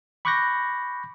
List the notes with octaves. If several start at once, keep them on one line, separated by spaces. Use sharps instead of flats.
B5 C#6 D6 F#6 G6 A#6